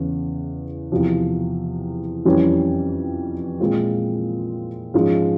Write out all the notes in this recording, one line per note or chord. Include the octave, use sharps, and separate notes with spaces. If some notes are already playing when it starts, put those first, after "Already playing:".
Already playing: E2 C#3 E3
E2 C3 F3
F2 E3 G3 C#4
A#2 G#3 C4 F4
G#2 F3 G#3 C#4 F4